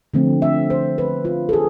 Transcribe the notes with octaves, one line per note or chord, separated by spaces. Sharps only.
D3 F3 A3 C4
E5
C5
B4
F4
A4
G#4